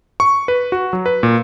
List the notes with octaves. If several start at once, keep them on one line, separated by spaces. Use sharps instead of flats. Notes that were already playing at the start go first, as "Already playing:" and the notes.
C#6
B4
F#4
F#3
B4
A#2